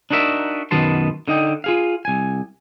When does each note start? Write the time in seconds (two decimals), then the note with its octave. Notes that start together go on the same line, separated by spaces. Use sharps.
0.10 D4 D#4 F#4 A#4 E5
0.71 F#2 B2 D#3 B3 A5 C6
1.28 D3 D#4 D#5 G5
1.64 F4 G#4 F5
2.05 C2 G#5